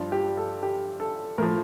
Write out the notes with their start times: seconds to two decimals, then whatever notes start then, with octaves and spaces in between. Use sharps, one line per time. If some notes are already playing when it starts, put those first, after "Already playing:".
Already playing: G2 F3
0.12 G4
0.37 A4
0.63 G4
1.00 A4
1.38 A2 A#4
1.42 F3